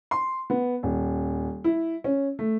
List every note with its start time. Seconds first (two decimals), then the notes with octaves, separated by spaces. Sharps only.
0.11 C6
0.50 B3
0.83 D#1
1.64 E4
2.04 C#4
2.39 A3